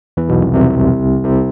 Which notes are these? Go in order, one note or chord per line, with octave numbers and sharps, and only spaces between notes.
E2 E3
B1 B2
C2 C3
C2 C3
C2 C3